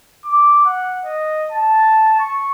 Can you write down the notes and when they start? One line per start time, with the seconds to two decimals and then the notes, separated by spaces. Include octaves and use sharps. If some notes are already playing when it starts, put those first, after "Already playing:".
0.25 D6
0.65 F#5
1.06 D#5
1.52 A5
2.19 C#6